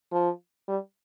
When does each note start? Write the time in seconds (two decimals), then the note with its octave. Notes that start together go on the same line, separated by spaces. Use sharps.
0.12 F3
0.68 G3